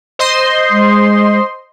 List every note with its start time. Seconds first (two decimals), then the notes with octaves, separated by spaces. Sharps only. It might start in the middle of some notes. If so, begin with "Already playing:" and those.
0.19 C5 D#5 C6
0.70 G#3